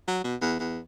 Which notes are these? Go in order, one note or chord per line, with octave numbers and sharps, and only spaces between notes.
F#3
B2
E2
E2